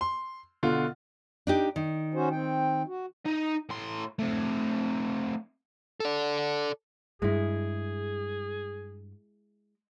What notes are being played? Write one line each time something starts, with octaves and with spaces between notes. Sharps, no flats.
C6
B2 D3 F4
D4 D#4 G4
D#3
C#4 F#4 C5
C4 G5
F#4
D#4 D#5
A2 C6
A3 C4
A4 D5
G2 G3 G#3 E4 G#4